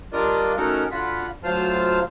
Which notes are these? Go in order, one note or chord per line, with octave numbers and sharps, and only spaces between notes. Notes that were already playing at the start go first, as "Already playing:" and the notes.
G3 D4 F4 A#4 D5 D#5
A3 C#4 D#4 F#4 A4 A#4
D3 F4 F#4 B5
D2 F#3 F4 C5 A5 F6